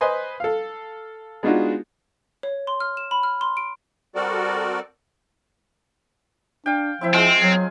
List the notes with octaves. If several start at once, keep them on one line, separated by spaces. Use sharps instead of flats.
B4 C5 D#5 G#5 C6
A4 F5
G#3 B3 D4 D#4 F4 F#4
C#5
C6
F6
E7
B5
F6
C6
D7
G3 C4 F#4 A4 A#4 D5
D4 F5 G5
F3 C4 E4 E5
G#3 C4 F4 G#4
F#3 G#5